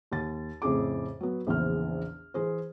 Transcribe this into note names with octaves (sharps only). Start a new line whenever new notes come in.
D#2 A6
F2 A2 C#3 G#4 D6
F#3 B3
A#1 E2 C#3 E3 C5 F6
E3 G#4 C5